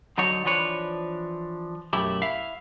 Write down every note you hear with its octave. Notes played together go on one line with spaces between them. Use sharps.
D3 F#3 D#4 A4 C#5
E3 F3 D4 B4 C#5
B1 F#2 A3 E4 G4
E4 E5 F5